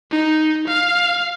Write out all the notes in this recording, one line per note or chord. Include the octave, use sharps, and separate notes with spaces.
D#4
F5